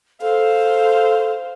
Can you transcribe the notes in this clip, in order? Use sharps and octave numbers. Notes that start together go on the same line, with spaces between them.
A4 C5 F5